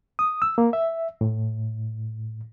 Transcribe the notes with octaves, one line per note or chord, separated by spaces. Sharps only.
D#6
E6
A#3
E5
A2